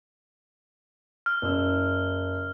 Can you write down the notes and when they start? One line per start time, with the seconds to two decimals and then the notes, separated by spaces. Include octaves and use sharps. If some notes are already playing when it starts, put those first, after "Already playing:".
1.26 F6
1.42 F#1 E6